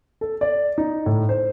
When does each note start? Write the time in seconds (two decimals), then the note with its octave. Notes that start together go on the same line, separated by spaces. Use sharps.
0.21 A4
0.41 D5
0.78 D#4
1.06 A2
1.29 C5